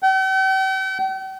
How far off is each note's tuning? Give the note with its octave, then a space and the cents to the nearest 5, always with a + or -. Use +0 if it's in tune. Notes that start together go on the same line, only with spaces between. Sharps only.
G5 -45